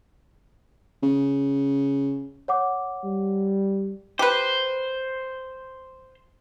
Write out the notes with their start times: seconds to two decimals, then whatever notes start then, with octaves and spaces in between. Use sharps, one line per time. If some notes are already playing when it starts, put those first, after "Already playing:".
1.02 C#3
2.48 C#5 F#5 D6
3.04 G3
4.19 G4 B4 C5